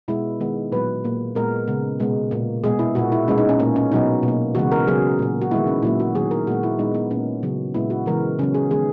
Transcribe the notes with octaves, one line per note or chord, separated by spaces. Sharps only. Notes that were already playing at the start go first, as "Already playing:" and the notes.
B2 G#3 B3 E4
D#3 G#3 B3
A#2 F#3 B3 B4
A#2 A#3
A#2 G#3 B3 A#4
C#3 G#3 B3
B2 G#3 B3
A#2 A#3
B2 G#3 B3 G#4
E4
A#2 A#3 F#4
E4
B2 G#3 B3 C#4
D#4
C#4
A#2 A#3 C#4
C#4
B2 F#3 B3 D#4
B2
A#3
C#3 E3 G#3 B3 F#4
A#4
C#3 F#3 B3 G#4
A#2 A#3
F#4
D#3 G#3 B3 E4
C#4
A#2 F#3 A#3 E4
F#4
D#3 F#3 B3 G#4
A#4
A#2 G#3 B3 F#4
E4
A#2 G#3 B3 D#4
B3
A#2 A#3 C#4
C#3 F#3 B3
A#2 G#3 B3 E4
F#4
C#3 E3 G#3 B3 A#4
C#3 F#3 B3 C#4
G#4
D#3 G#3 B3 G#4